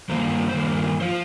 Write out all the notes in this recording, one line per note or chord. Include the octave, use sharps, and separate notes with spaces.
G2 D#3 A#3 C5
G2 D#3 A#3
F3 C5